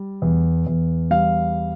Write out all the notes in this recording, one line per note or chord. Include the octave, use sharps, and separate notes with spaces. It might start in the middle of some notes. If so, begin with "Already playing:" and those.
Already playing: G3
E2
E2
G3 F5